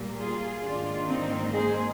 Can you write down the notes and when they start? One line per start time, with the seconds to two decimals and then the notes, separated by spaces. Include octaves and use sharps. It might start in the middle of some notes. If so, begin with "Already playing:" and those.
Already playing: A#2 G3 A#3
0.19 F4 G#4
0.63 G#2 D#3 A#3 D4 F4
1.08 C4 D#4
1.52 G#4 C5